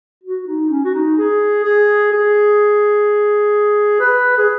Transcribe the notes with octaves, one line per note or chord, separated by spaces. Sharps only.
F#4
D#4
C#4
F#4
D#4
G#4
G#4
G#4
B4
G#4